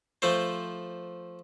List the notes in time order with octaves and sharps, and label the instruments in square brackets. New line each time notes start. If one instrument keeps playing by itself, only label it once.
[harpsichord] F3 A3 C5